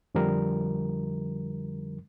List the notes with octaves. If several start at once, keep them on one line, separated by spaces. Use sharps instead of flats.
F2 D3 F3 G3 A#4